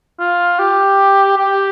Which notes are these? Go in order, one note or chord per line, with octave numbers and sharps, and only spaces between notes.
F4
G4
G4